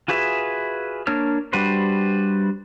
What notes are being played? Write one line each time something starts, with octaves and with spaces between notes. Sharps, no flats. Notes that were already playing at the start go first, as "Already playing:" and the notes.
F4 F#4 G#4 B4 E5
A#3 D4 C#5 F6
G3 D4 F#4 B4 C5